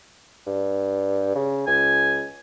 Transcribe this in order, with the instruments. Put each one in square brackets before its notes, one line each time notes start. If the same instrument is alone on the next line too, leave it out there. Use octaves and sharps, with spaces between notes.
[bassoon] G2
C#3
[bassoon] C#2 [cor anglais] G#5